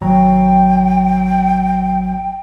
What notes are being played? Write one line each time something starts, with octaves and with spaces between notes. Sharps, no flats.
G#1 F#3 G5 A#5